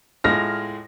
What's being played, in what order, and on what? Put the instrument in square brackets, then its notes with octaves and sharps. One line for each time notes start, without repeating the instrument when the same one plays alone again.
[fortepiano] A2 G#3 F4 [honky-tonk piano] F6 A#6